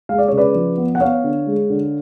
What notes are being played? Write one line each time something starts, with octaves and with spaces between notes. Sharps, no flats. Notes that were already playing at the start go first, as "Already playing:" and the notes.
G#3 F5
D5
C#3 C#5
B4 D5
F3
B3
F#5
B3 C#5 F5
D3
G#3
D3